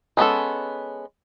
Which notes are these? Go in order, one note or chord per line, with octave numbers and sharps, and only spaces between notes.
G#3 B3 C#4 A4